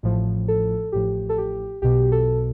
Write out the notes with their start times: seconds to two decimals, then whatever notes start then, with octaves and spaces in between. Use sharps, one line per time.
0.03 A1 A2 F3
0.48 A4
0.92 A1 A2 F3 G4
1.29 A4
1.38 G4
1.82 B1 B2 G4
2.12 A4